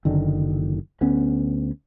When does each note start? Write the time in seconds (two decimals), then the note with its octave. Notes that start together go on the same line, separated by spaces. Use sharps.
0.05 F#1 D3 D#3
1.01 D2 B3 C#4